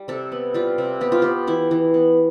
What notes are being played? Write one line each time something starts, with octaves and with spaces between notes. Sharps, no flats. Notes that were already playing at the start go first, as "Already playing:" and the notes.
Already playing: G3
C3 A4
B3
G3 F4
C3
B3 G4
F4
B3 G4
E3 E4
E3
B3